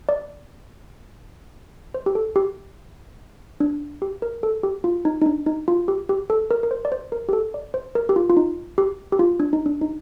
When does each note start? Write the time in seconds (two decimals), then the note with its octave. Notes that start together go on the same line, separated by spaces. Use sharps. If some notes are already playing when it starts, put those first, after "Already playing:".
0.09 D5
1.94 C5
2.06 G4
2.15 A4
2.36 G4
3.60 D4
4.02 G4
4.22 A#4
4.43 A4
4.63 G4
4.84 F4
5.05 D#4
5.21 D#4
5.26 D4
5.46 D#4
5.68 F4
5.88 G4
6.09 G4
6.30 A4
6.51 A#4
6.63 A#4
6.71 C5
6.85 D5
6.92 C5
7.12 A#4
7.29 G4
7.33 A4
7.54 D5
7.74 C5
7.95 A#4
8.09 G4
8.16 F4
8.30 F4
8.37 D#4
8.78 G4
9.12 G4
9.19 F4
9.40 D4
9.53 D#4
9.66 D4
9.81 D#4